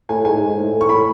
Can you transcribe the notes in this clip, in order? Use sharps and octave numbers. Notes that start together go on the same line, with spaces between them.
A2 G#5
G#2 G#5
G#2
G#2
A2
A2
C#6
A2 B5